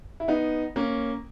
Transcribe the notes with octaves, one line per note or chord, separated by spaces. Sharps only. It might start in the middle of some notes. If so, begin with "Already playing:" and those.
E4
B3 D#4
A#3 C#4